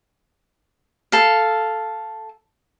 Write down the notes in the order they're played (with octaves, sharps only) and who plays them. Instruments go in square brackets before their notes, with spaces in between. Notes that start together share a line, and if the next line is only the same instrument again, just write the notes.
[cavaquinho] A4 F5